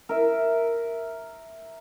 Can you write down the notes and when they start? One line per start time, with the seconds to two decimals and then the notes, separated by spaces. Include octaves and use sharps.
0.09 A#4 E5